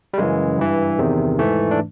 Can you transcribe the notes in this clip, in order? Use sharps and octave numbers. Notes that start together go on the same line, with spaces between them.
G3
F#2 C#3 E3 G#3
G2 E3
E2 C3 D#3
G#2 E3 A3
D4